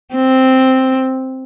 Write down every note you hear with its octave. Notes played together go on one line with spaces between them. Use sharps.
C4